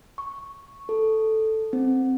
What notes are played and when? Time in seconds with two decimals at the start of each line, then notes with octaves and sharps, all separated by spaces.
0.18 C#6
0.89 A4
1.73 C4